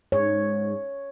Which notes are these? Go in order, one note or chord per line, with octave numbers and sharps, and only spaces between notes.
G#2 C#5